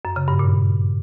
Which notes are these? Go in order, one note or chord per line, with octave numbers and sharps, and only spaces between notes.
F#2
C#3
G2
A#2